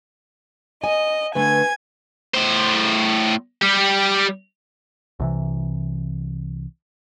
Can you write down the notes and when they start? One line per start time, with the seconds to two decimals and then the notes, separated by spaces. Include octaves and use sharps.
0.84 D#5 G#5
1.35 D3 A3 B4 G#5 G#6
2.34 A2 C5
3.62 G3 G4
5.20 C2 C3 E3